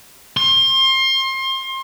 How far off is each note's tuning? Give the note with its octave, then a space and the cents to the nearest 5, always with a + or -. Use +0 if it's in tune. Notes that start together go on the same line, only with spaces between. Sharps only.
C6 +30